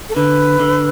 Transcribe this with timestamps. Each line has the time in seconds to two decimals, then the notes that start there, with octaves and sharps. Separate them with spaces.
0.09 A4
0.15 D3 B4
0.60 D3